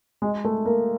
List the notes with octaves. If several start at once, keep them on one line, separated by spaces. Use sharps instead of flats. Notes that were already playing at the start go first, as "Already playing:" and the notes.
G#3
A3
A#3